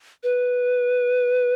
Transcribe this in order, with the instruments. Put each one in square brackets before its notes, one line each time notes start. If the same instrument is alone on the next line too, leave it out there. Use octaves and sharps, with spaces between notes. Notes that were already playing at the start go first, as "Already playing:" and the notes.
[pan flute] B4